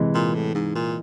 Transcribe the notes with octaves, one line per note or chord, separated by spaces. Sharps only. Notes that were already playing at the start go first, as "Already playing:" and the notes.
Already playing: C3 E3 G#3
A#2
A2
G#2
A#2